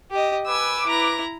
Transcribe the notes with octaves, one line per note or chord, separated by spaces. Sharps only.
G4 D#5
B4 G#5 D6 E6
E4 A#5